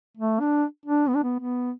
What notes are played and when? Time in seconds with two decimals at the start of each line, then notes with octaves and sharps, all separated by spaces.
0.17 A3
0.40 D4
0.86 D4
1.08 B3
1.15 D4
1.23 B3
1.39 B3